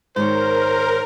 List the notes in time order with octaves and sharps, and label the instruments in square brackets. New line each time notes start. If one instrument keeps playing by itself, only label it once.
[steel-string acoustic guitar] G#2 D#3 C#5 [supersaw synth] A#4 [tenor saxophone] C5